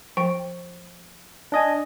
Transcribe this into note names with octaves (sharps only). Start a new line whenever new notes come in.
F3 G5
D4 D#5 G#5